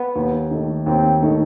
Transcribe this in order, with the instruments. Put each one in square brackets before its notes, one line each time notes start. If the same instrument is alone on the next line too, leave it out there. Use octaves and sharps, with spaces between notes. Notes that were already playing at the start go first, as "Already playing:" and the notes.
Already playing: [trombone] B3
[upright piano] D#2
D#3 A3 D#4
[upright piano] D#2 [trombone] C4
[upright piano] D#3 A3 D#4